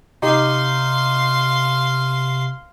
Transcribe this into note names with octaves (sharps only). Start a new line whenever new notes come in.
C3 D#4 G4 F5 C6